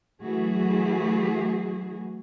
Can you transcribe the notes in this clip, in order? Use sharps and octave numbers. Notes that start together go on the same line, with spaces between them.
E3 F#3 A3 F#4 G#4